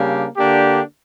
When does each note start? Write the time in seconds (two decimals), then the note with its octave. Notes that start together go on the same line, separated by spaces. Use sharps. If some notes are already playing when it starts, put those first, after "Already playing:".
Already playing: C#3 G3 A#3 D4 G4
0.37 D3 A#3 D4 G4